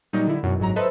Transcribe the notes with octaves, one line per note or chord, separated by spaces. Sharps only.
A#2 F#3 G3 D#4
D3 E4
F#2 B2 F#3
G1 G#2 F#3 A#5
A4 B4 C5 D#5 E5